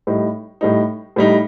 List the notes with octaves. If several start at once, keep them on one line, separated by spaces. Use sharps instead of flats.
A2 G3 D#4
A2 G3 D#4
A2 G3 D#4